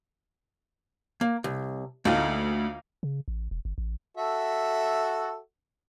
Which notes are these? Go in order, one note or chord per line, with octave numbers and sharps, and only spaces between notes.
A#3
C2
D2 A3 A#3 D#4 F4 G5
C#3
A1
E1
G1
A1
F#4 A4 E5